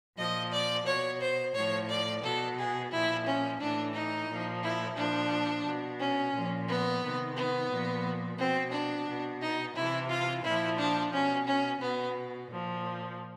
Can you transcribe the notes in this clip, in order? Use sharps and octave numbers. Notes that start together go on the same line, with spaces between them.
A#2 F3 D#5
D5
B2 C#5
C5
A2 F3 C#5
D5
B2 A4
G#4
A#2 F3 E4
C#4
A2 E3 D4
D#4
A#2 F3
E4
A#2 F3 D4
B2
C#4
A#2 F3
B3
C3 D#3
B3
A#2 F3
B2 C4
D4
B2
D#4
C3 E3 E4
F4
A#2 F3 E4
D4
B2 C#4
C#4
B2 B3
A#2 F3